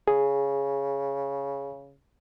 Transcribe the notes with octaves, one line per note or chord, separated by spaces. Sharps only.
C#3 G#4